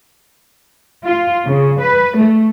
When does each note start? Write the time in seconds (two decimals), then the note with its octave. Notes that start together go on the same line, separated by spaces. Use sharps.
1.05 F4
1.45 C#3
1.80 B4
2.17 A3